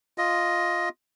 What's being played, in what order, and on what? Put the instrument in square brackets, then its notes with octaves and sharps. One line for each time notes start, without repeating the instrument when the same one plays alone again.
[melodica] F4 D#5